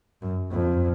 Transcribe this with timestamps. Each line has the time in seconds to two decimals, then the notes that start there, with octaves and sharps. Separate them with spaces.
0.22 F#2
0.51 F2